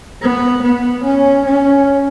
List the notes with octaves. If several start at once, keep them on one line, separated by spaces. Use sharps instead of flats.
B3
B3
C#4
C#4